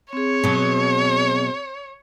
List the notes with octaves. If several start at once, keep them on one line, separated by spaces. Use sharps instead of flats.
C4 G#4 C#5
B2 F#3